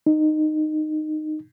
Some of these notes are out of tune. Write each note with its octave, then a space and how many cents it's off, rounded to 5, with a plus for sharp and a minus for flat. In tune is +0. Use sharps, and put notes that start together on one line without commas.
D#4 -15